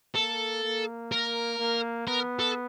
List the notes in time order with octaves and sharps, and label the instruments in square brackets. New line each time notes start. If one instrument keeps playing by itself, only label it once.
[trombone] A#3 [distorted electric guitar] A4
[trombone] A#3
[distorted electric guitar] A#4
[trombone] A#3
[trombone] B3 [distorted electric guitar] A#4
[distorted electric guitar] A4